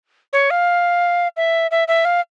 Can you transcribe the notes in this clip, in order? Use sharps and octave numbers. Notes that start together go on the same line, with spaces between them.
C#5
F5
E5
E5
E5
F5